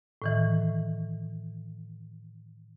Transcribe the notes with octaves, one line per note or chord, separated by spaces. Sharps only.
A2 D#3 E3